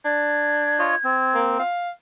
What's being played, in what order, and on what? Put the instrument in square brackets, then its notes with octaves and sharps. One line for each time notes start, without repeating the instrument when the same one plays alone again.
[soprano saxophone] D4 [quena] G#6
[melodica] F4 C#5 D#5
C4
[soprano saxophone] A#3
F5